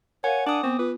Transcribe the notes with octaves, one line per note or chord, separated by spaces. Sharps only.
A#4 C#5 F5 F#5 G#5
D4 D6 D#6
B3 C4 C#6
F4 B4